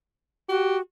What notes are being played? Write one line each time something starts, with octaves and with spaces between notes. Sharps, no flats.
F#4 G4